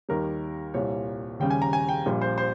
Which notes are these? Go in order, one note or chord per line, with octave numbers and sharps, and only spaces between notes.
D#2 D#3 G3 A#4
C2 A#2 G3 C#5
D#2 C#3 G3 G5
G#5
A#5
G#5
G5
A#1 A#2 G3
C5
C5